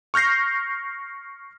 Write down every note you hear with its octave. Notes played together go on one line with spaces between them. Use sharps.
C#6 F6 G6 A#6 C7